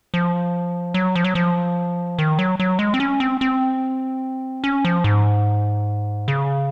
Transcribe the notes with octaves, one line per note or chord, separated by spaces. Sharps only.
F3
F#3
F3
F#3
F3
D#3
F#3
F#3
G#3
C4
C#4
C4
C4
C#4
F3
G#2
C#3